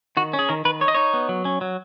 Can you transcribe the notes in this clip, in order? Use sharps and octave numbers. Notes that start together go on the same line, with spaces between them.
D#3 F#4
C#4
G#4
D#3 A#4
D#3 B4
D#4 C#5
D#5
D#4 C#5
B3
F#3
C#4
F#3